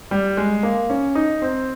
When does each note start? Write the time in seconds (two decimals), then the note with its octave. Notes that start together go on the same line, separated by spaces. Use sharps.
0.11 G3
0.37 G#3
0.63 A#3
0.90 C#4
1.15 D#4
1.42 C4